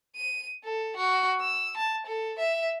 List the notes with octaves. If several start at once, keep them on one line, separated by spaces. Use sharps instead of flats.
D#7
A4
F#4
E6
A5
A4
E5